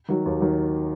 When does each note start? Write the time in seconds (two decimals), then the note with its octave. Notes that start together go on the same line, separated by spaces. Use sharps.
0.09 D#3 F#3
0.25 D#2
0.40 D#3 F#3